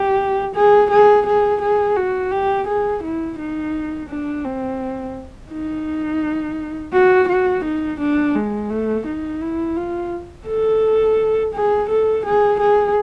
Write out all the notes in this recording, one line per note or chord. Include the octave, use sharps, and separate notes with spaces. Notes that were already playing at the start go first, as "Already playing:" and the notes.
Already playing: G4
G#4
G#4
G#4
G#4
F#4
G4
G#4
E4
D#4
D4
C4
D#4
F#4
F#4
D#4
D4
G#3
A3
D#4
E4
F4
A4
G#4
A4
G#4
G#4